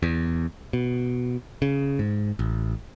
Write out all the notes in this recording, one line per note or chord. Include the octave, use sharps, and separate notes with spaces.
E2
B2
C#3
G#2
A1